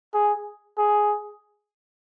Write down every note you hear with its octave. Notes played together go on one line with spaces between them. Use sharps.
G#4
G#4